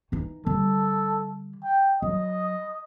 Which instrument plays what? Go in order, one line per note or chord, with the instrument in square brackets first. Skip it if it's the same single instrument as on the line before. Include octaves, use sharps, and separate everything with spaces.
[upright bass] E3 D#4
[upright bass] D3 G3 [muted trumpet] A4
[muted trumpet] G5
[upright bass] F#3 [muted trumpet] D#5